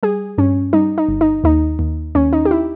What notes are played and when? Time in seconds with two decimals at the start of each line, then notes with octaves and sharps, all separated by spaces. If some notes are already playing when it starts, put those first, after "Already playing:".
0.03 G3 G#4
0.38 G2 C#4
0.73 G3 D#4
0.98 D#4
1.08 G1
1.21 D#4
1.44 D#2 D#4
1.79 D#2
2.15 D#2 C#4
2.33 D#4
2.45 G4
2.51 E4